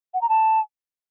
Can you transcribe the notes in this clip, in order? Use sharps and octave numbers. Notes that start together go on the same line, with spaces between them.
F#5
A#5
A5